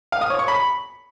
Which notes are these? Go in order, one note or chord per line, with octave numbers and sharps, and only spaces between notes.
F5
D#6
C#5
C#6
B5